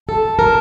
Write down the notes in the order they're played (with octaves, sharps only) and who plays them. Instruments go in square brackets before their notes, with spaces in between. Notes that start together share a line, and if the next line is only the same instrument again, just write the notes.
[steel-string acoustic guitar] A4 [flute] A5
[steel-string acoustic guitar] A#4